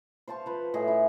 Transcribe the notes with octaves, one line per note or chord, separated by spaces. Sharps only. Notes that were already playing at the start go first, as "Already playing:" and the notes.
C5 F5 A5 C#6
F3 B4
A2 G#4 D#5 E5
E4